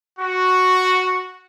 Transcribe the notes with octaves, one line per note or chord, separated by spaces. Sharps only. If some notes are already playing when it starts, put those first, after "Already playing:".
F#4